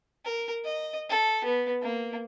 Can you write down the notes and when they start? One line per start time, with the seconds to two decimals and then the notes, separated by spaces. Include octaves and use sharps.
0.25 A#4
0.65 D#5
1.10 A4
1.45 B3
1.82 A#3